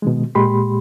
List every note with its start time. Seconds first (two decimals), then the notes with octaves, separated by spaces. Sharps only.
0.02 B2 D#3 G#3
0.35 A#2 G#3 G4 B5 C6